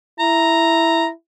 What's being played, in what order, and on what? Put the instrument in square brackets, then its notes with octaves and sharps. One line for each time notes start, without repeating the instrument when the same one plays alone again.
[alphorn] E4 [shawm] A#5